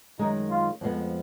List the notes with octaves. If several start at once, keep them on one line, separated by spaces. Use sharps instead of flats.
F#2 D#3 G#3 D#4
F4
F2 F3 G#3 B3